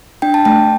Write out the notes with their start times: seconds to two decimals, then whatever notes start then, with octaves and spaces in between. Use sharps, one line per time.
0.22 D4 G5
0.34 A5
0.45 A3 G5